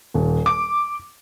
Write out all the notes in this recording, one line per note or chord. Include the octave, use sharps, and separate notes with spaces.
D#1
D6